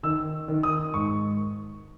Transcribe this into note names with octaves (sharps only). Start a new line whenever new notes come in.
D#3 E6
D#3
D#6
G#2 C#6